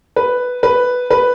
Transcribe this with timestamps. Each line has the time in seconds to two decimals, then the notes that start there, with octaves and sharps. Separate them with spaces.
0.16 B4
0.63 B4
1.11 B4